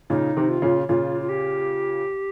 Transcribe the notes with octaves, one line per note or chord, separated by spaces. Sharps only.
A#2 C#3 D#4
C3 D#3
F4
A#2 C#3
A#2 C#3 F4
F4
G4